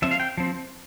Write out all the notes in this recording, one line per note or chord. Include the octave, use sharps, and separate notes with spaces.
F3 C4 E5
F5
G5
F3 C4